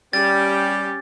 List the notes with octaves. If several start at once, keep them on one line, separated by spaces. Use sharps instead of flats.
G3 C#4 G4 A6